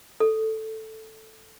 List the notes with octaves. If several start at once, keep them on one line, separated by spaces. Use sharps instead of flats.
A4